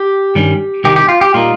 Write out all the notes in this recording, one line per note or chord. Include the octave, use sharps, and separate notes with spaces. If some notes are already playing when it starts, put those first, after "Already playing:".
Already playing: G4
G2 D#3 G3 C#4
C2 C3 D#3 G4
G4
F4
G4
A#2 G3 A#3 D#4 F4